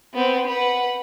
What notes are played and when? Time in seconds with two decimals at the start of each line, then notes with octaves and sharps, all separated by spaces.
0.14 B3 C4
0.47 B4 F#5